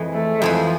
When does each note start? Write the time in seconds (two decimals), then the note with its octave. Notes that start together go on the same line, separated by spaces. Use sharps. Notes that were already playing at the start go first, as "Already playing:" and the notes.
Already playing: F2 E3 G#3
0.13 A3
0.42 F2 E3 F3 G#3